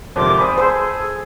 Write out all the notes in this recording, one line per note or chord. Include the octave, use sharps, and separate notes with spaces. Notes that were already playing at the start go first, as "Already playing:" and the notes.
G#1 F2 C3 A#4 C6 D6
C5 D5 G#5 B5 D#6
G#4 A4 C5